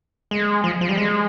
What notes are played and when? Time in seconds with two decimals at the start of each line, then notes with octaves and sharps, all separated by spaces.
0.31 G#3
0.64 F3
0.81 F3
0.89 G3
0.97 G#3